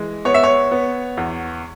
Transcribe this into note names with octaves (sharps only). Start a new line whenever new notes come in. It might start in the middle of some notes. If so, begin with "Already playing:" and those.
Already playing: E3 G#3
B3 C#5
E5
C#5
B3
E2